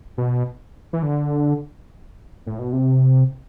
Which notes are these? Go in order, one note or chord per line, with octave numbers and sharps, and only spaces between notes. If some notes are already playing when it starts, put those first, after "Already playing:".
B2
E3
D3
A2
B2
C3